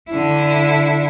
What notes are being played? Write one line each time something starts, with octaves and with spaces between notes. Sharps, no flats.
D3 E4